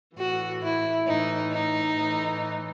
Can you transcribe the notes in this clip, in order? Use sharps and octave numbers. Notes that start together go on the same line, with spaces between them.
A2 E3 F#4
E4
A2 E3 D#4
D#4
A2 E3